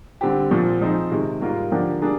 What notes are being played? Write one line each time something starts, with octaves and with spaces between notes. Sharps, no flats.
D3 G3 C4 G4
A#2 F3 C4
F3 C4 D#4 G#4 C5
C3 D#3 G#3
G#2 G3 A#3 F4 A#4
D3 F3 A#3 D4 G4
G3 A#3 D4 G#4